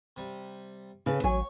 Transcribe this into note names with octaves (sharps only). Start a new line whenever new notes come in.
C3 G3
C#3 A4 B4
A1 F#3 C#5 G#5